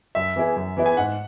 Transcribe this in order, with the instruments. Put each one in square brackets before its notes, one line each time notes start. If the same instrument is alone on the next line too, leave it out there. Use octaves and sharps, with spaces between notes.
[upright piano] F#2 [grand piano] E5
[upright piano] E3 B3 E4 G#4
F#2
E3 B3 E4 G#4
[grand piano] G#5
[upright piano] G#2 [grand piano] F#5